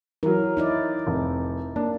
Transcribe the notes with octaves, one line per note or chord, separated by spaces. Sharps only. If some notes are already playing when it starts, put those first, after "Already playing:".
E3 F#3 A#4
D#4 E4 D5
F1
A#3 D4